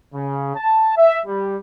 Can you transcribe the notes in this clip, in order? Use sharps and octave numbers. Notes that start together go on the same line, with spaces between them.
C#3
A5
E5
G3